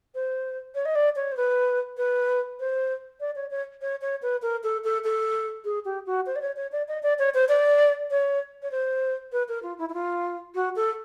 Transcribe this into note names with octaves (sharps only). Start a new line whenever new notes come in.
C5
C#5
D#5
D5
C#5
C5
B4
B4
C5
D5
C#5
C#5
C#5
C#5
B4
A#4
A4
A4
A4
G#4
G4
F#4
C5
D5
C#5
C#5
D5
D#5
D5
C#5
C5
D5
C#5
C#5
C5
B4
A#4
F4
E4
E4
F4
F#4
A4